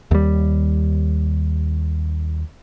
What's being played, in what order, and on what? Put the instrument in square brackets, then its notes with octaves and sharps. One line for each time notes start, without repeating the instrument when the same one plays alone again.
[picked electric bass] D#2 G3